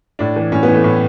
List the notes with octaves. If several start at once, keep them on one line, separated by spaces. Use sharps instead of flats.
A2 D4
E3
A2 C#4
B3
E3
A3
A2